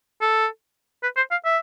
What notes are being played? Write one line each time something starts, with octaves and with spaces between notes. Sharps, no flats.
A4
B4
C5
F5
E5